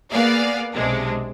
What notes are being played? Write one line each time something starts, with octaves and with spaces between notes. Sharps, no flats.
A#3 B3 G#4 D5 F5
B1 C3 G#3 D4